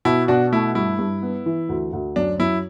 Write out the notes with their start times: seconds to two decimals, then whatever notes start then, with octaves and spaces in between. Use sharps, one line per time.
0.05 B2 E4
0.28 B2 D4 F#4
0.52 A3 E4
0.75 G2 E4
0.99 G2
1.22 B3
1.46 E3
1.69 D2
1.93 D2
2.16 F#2 D4
2.40 F#2 E4